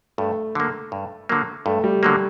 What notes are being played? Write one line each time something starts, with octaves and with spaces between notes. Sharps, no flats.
G2 A3
D3 F#3 A#3
G2
D3 F#3 A#3
G2 A3
G3
D3 F#3 A#3